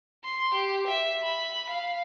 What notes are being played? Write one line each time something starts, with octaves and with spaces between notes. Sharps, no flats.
C6
G4
E5
B5
F5